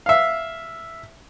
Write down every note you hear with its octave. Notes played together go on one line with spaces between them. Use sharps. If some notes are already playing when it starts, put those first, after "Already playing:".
E5 F5